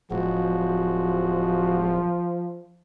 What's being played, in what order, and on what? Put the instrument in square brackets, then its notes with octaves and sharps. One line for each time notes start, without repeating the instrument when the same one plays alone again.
[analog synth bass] D1 [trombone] F3 [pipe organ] G#3 F#4